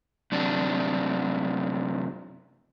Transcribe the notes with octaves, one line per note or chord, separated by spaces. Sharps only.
F#2 C3 D4